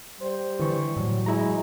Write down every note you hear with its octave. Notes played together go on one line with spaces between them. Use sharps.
G3 C5
D3 E3 C#6
A2 F#3
G#3 E4 A#5